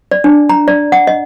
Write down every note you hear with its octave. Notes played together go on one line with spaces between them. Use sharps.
D5
D4
A#5
D5
F#5
D#5